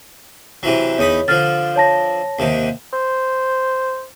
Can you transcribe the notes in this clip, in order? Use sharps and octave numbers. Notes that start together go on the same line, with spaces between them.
C3 E3 F#3
E2 D#4 C#5 B5
D3 F3 F6 A6
C#5 A5 A#6
D#2 C3 D#3
C5